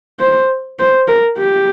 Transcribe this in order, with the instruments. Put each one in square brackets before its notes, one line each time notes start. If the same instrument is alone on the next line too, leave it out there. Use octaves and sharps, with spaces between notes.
[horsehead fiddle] C5
C5
A#4
G4